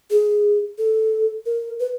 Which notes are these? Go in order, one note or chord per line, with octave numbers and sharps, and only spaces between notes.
G#4
A4
A#4
B4